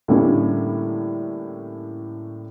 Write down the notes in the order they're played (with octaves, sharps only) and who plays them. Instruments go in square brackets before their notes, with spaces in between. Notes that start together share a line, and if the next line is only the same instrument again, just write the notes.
[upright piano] A2 D3 G3 A#3 C#4